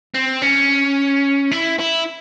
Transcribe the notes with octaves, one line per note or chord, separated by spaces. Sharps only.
C4
C#4
E4
E4